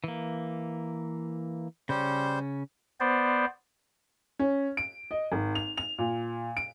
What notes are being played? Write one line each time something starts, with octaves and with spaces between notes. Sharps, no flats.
E3 A#3
C#3 G3 C#4 C5
B3 C5 D5
C#4
D7
D#5
G#1
F7
F7
A#2
D7